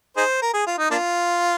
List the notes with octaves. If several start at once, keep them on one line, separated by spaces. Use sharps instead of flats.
D#4 G#4 C5
A#4
G#4
F4
D#4
A#3 D4 F4